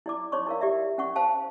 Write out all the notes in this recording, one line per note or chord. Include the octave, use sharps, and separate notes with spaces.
E4 D5 D6
D#4 C#5 D5 C6 C#6
E4 A#4 F5
G4 D5 E5
C#4 F#5 C#6
C5 F5 G5 A5